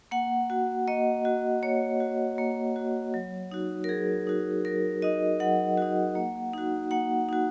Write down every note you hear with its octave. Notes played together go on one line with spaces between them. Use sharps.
A#3 F#5
F#4
A#3 D#5
F#4
A#3 C#5
F#4
A#3
F#4
F#3
D#4 F#4
A#4
F#3 G#4
D#4 F#4
F#3 A#4
D#4 F#4 D#5
F#3 F#5
D#4 F#4
A#3
D#4 F#4
A#3 F#5
D#4 F#4